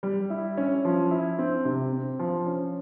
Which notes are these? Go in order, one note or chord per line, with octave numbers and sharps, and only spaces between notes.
G3
E4
C#4
F3
E4
C4
C3
C4
F3
C#4